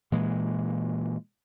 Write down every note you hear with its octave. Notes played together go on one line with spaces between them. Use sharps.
A#2 E3 G#3